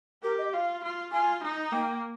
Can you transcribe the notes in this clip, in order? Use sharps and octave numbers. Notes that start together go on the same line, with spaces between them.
G4 A#4
D#5
F4 F5
F4
F4 G#5
D#4
A#3 G5